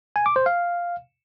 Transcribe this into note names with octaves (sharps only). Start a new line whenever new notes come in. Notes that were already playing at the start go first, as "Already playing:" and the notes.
G#5
D6
C5
F5